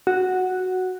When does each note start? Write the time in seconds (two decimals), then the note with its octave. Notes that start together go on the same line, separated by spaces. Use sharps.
0.07 F#4